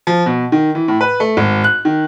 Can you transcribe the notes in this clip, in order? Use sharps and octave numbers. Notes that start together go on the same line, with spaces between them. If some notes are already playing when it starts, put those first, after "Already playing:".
F3
B2
D#3
E3
A2
B4
A3
G#1
F#6
D#3